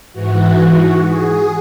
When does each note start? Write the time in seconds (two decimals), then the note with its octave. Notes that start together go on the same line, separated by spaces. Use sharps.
0.13 G#2 E3 F#4
1.05 G#4